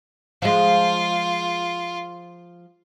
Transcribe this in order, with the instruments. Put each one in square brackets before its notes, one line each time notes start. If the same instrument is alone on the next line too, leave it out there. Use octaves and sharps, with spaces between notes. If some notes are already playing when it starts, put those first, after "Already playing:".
[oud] F3 G#3 [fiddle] F4